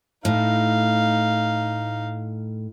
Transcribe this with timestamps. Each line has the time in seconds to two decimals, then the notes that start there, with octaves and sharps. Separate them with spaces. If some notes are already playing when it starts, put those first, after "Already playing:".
0.25 A2 D#4 F5